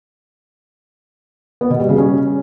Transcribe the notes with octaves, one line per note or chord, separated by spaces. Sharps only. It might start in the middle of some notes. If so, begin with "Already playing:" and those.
B3
B2
G3
C#3
C#4